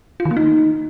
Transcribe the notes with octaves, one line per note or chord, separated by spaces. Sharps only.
F4
D#3
A#3
D#4